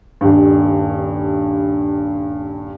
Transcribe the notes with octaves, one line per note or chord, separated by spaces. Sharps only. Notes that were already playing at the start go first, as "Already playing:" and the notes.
D#1 G2